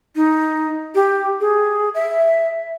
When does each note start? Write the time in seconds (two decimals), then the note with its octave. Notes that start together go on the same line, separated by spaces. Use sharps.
0.16 D#4
0.95 G4
1.41 G#4
1.94 E5